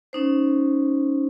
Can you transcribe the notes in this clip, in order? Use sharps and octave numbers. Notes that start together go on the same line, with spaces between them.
C#4 D#4 C5